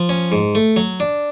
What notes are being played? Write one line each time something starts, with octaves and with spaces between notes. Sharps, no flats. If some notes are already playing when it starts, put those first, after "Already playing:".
Already playing: F3
C#4
G#2
A3
F#3
D4